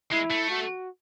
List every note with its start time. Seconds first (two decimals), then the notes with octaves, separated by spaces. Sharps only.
0.11 G#3 E4
0.31 A3
0.50 F#4